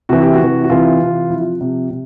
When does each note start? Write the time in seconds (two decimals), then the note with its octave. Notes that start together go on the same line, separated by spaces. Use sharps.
0.09 C3 E3 F#4
0.22 G4
0.34 F#4
0.40 C3 E3
0.64 F#4
0.70 C3 E3 F4
1.00 C3 E3
1.30 C3 F3 E4
1.41 F4
1.61 C3 F3
1.90 C3